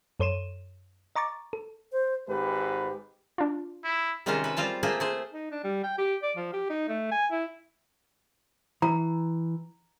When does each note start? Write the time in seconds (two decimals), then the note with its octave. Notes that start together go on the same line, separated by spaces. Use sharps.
0.20 F#2 A4 C#5 C6 D#7 E7
1.16 D#5 A#5 C#6 D6 A6
1.53 A4
1.92 C5
2.28 G#1 G#2 G4 B4
3.38 D4 F4
3.84 E4
4.26 C3 D#3 G#3 C#4 F4 C5
4.44 B4 E5
4.57 G3 C4 F4 F5 A5
4.83 A3 A#3 F4 G#4 C5 E5
5.00 A3 G#4 C5
5.32 D#4
5.51 D4
5.64 G3
5.83 G5
5.98 G4
6.23 D5
6.36 F3
6.53 G4
6.70 D#4
6.89 A3
7.11 G#5
7.31 E4
8.82 E3 A#5